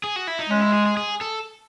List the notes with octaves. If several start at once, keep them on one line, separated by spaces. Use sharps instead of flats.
G#4
F#4
E4
D#4
G#3 C#4
E4
G#4
G#4
G#4
A4